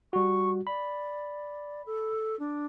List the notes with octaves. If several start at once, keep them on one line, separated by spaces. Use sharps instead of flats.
G3 F#4 C#6
D5 B5
A4
D4